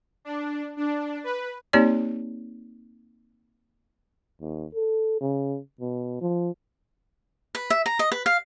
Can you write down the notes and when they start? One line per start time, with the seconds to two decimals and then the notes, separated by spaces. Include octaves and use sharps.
0.25 D4
0.77 D4
1.24 B4
1.73 A#3 C4 D#4 G4 C#5 D5
4.41 D#2
4.75 A4
5.21 C#3
5.81 B2
6.21 F3
7.55 B4
7.70 E5
7.86 A#5
7.99 D#5
8.12 B4
8.26 F5